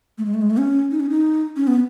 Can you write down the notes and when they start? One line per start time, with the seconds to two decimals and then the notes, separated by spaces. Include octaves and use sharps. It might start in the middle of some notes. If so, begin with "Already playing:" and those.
0.18 A3
0.26 G#3
0.34 A3
0.42 G#3
0.50 A3
0.58 C#4
0.91 D#4
1.00 C#4
1.10 D#4
1.56 C#4
1.67 B3